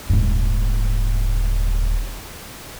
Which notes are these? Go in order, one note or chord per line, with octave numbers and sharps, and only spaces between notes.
D#1 G#2